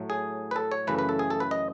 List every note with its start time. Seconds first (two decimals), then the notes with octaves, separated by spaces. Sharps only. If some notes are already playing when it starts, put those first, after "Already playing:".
Already playing: A2 F#3 A3
0.10 G#4
0.51 B4
0.56 A4
0.71 C#5
0.87 F#2 C#3 E3 A3 B4
0.99 B4
1.09 A4
1.19 G#4
1.30 A4
1.40 B4
1.51 D#5